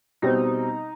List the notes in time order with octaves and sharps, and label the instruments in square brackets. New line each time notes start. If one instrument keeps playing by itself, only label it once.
[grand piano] B2 G3 C4 [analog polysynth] D#4